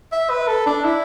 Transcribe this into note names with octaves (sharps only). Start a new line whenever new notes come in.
E5
B4
A4
D4
E4